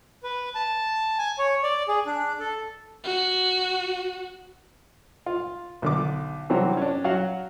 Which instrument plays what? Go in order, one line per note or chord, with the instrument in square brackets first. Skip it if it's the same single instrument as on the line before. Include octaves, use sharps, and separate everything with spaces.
[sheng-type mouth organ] B4
A5
G#5
C#5
D5
G#4
D4
A4
[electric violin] F#4
[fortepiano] F4
B1 D3 D6
C3 E3 F#3 G3 C4
C#4 D4
F#3 F#4 F5 F#5